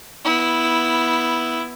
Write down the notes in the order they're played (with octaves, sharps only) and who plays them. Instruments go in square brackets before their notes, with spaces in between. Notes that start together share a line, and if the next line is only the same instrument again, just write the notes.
[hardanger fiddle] B3 E4